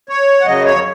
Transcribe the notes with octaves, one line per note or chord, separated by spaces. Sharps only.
C#5
F#5
F#2 C#3 F#3 D#5
C#5